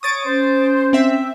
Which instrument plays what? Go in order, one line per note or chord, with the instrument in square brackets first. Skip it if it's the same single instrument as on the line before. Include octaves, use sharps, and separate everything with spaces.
[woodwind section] C#5 C#6 [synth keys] D#6 A6 D7
[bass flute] C#4 [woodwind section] C5
[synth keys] C4 E5